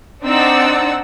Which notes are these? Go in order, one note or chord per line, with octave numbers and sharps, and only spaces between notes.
C4 D4 D#4 D5 F#5 E6